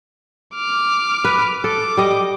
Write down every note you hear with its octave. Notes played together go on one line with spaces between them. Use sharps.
D6 F6
B4
A4 D6
G3 D#5